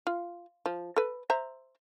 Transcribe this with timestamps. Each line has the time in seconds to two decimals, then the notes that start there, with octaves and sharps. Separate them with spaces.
0.07 F4
0.66 F3
0.96 A4 B4
1.30 C5 E5 A#5